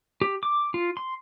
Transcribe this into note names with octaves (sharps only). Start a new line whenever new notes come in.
G4
D6
F4
C6